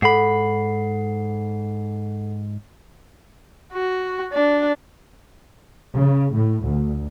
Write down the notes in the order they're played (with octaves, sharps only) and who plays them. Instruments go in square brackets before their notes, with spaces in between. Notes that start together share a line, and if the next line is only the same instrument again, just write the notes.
[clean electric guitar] G#2 B5 [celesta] A4 F#5 C7
[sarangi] F#4
D4
[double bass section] C#3
A2
D2